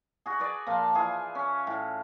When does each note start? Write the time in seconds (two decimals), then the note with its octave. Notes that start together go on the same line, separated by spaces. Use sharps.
0.26 F#4 G#4
0.40 G#4 B4 D5
0.67 A#2 F3 F4 A5
0.94 E3 F4 G#4
1.35 C#4
1.67 A2